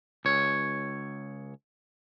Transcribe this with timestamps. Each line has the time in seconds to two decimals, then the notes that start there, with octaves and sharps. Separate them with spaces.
0.25 C#2 C#5